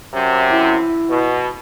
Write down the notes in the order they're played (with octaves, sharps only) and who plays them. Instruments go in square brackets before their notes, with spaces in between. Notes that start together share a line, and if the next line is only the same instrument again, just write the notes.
[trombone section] F#2 C3
[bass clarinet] E4
[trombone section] B2